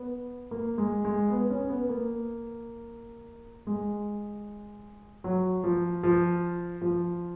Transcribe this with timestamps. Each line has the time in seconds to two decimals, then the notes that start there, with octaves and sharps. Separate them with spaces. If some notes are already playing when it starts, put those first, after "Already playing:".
Already playing: B3
0.51 A#3
0.78 G#3
1.04 G#3
1.30 B3
1.50 C#4
1.70 B3
1.89 A#3
3.67 G#3
5.24 F#3
5.64 F3
6.03 F3
6.82 F3